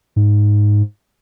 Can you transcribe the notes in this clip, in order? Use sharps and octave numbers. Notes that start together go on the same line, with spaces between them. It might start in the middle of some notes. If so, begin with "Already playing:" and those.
G#2